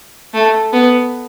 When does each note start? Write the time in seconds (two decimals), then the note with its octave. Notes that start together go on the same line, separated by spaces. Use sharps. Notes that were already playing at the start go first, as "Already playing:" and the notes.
0.34 A3
0.73 B3